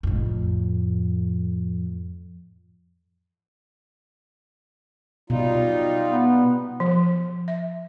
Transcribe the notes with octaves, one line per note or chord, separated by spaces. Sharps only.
F2 A2
B2 G3 D#4 F4
B3
F3
E5